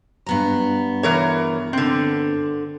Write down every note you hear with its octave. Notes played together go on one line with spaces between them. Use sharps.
G2 B3 A#5
E3 A#4 C#5
D3 C4